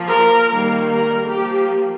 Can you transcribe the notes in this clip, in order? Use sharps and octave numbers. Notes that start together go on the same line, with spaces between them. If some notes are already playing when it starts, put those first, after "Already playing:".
Already playing: F3 A#3
A#4
D#3 G3 A#3
A#4
F3 A#3 G4